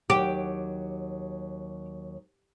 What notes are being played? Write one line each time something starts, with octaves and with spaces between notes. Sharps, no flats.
D#2 F#3 G4 G5